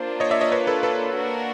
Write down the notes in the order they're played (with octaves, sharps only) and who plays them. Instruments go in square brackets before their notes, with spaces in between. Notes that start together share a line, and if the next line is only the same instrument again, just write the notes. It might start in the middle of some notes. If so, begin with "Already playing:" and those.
Already playing: [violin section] A#3 D4 F4 [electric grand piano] C5
[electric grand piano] C#5 D#5
D5 E5
C#5 D#5
B4 C#5
A4 B4
A4 B4
[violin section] A#3 D4 F#4 A#4